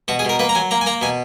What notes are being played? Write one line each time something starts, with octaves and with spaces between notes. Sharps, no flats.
B2 F#4
G#4
B2 A#4
A#3 B4
A#5
F#3 G#5
A#3 A#5
G#5
A#3 A#5
B2 G#5